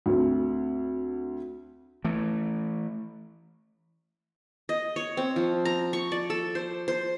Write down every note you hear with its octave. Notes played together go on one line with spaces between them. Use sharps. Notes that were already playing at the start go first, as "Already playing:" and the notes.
D2 C4
E3 A3
D#5
C#5
C4
F3
A#5
C#6
D5
A4
C5
C5